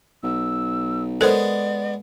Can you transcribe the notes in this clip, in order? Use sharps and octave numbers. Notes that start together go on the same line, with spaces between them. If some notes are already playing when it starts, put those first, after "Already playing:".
B1 E6
G#3 B3 A4 A#4 C5 D5